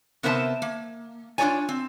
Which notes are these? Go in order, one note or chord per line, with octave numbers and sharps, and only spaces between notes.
C3 B3 A#4 C5 E5 A5
A#3
D4 F4 G#4 C#5 D5 G#5
C4